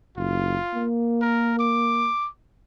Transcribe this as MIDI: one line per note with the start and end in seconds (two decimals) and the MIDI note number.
0.17 0.57 30
0.17 0.87 65
0.74 2.10 58
1.22 1.55 70
1.59 2.28 86